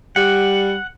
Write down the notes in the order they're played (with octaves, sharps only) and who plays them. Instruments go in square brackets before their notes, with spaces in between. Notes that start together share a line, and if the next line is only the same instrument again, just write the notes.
[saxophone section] G3 [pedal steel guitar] F#5